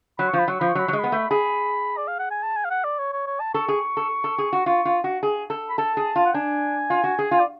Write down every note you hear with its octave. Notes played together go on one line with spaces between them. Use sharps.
F#3 B5
F3 C#6
B5
F#3 C#6
F3 B5
C#6
F#3
B5
F#3 G#3 C#6
B3 B5
A3
G#4 B5
D5
F5
F#5
G#5
A5
G#5
F5
F#5
D5
C#5
C#5
C#5
A5
A4 C#6
G#4
A4
A4
G#4
F#4
F4 C#6
F4
F#4
G#4
A4
B5
A4 A5
G#4
F4
F#5
D4 G#5
F4
F#4
G#4
F4
D5